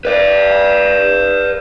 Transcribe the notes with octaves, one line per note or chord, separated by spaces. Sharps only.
B4 D5